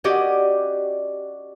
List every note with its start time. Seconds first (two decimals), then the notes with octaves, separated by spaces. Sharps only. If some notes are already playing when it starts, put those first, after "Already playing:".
0.04 C#4 F#4 G4 D5 D#5